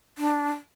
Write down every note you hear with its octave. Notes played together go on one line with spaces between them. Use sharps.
D4